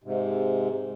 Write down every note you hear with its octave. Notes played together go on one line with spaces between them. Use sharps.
G#2 C3